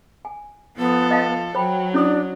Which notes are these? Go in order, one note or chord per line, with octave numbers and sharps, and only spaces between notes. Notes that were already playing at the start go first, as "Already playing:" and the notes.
G#5
F3 B3 A4
D#5 F5 A5
F#3 C5 G5 B5
C#4 D4 E4 D#6